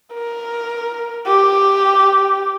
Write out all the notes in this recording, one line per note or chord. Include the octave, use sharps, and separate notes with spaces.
A#4
G4